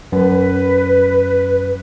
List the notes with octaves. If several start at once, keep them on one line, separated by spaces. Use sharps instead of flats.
F#2 B4